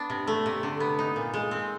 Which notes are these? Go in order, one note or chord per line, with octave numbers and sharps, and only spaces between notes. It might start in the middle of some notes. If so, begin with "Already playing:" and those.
Already playing: B3 D4
C3
A3
C3
D3
B3
D#4
A#2
G#3
C4